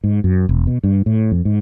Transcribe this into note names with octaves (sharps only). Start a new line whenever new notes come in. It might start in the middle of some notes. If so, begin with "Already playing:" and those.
G#2
F#2
E1
B2
G2
A2
F2
G#2